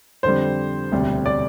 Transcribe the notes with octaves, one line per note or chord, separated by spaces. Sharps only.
F2 D3 G3 C5
E1 D2 C3 G3
D5